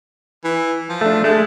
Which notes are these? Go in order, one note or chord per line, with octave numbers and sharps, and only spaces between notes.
E3
F3
A3 D4
G#3 A3